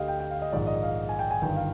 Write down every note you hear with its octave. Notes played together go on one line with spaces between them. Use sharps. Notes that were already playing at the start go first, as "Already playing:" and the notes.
Already playing: D2 D3 G4 D#5 F5
G5
G5
F5
D#5
A#1 G#2 D#3 D5
D#5
F5
G#5
G5
G#5
G1 G2 D#3 G5
F5